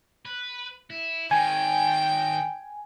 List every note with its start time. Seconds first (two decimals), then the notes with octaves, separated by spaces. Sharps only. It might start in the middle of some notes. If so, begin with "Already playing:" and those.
0.25 B4
0.90 E4
1.31 D#3 G#3 G5 G#5